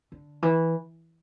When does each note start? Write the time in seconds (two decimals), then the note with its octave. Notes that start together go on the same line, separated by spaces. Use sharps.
0.12 D3
0.42 E3